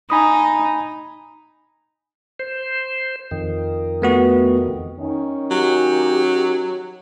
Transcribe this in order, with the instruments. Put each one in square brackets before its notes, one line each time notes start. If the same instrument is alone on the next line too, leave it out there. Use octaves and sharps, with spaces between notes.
[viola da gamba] D#4 [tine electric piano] G#5 B5 D#6
[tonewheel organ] C5
F2 D#3
[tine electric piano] A3 B3 F#4
[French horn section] D#3 C#4 D#4
[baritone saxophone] F#3 [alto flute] G4